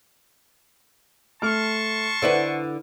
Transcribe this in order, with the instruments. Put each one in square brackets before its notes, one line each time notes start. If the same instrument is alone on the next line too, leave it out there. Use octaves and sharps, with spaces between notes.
[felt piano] A3 F6 [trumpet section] A5 C6 C#6
[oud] D3 E4 B4 [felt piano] C5 D5 F#5